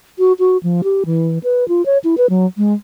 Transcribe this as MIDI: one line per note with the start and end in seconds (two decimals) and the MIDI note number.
0.19 0.33 66
0.39 0.57 66
0.63 0.82 53
0.84 1.04 67
1.06 1.39 52
1.44 1.67 71
1.68 1.85 65
1.86 1.98 73
2.04 2.15 64
2.18 2.27 71
2.30 2.46 54
2.57 2.74 56